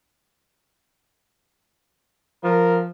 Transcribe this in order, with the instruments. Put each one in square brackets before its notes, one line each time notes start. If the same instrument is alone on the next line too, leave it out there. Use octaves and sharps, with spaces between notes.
[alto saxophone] F3 [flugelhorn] A#4